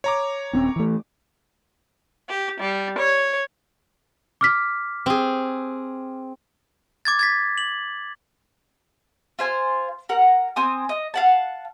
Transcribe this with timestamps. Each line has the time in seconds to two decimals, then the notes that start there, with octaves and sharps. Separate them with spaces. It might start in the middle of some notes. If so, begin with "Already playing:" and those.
0.04 C#5 A#5 D6
0.53 D#1 C4 C#4
0.76 E3 A3
2.29 G4
2.61 G3
2.98 C#5
4.41 D6 F6 B6
5.06 C4 G#4
7.05 D6 G#6 A6
7.19 G#6 A6 B6
7.58 F#7
9.39 F4 C5 G#5
10.09 A#4 F#5
10.56 C4 G#5 D#6
10.89 D#5
11.14 F5 F#5 A5